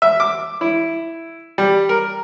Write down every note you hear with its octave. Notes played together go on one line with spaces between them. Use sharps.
E5
D6
E4
G3
A#4